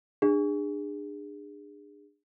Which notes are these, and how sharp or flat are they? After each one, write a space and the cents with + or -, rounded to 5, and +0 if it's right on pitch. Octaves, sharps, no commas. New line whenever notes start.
D4 +25 G#4 -25